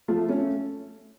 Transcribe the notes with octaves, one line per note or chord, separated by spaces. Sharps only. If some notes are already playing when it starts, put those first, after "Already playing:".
F3 A3
A3 C#4